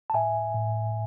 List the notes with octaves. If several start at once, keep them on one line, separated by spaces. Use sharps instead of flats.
A5
A2 E5 G#5
A2